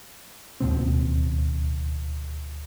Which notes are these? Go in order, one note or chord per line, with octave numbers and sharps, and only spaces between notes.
D1 D#2 B2 C4